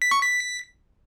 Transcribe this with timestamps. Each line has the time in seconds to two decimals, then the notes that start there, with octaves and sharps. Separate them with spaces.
0.02 B6
0.11 C#6
0.21 B6